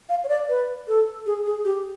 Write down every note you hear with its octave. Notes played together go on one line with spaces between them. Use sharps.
F5
C#5
D5
B4
A4
G#4
G#4
G4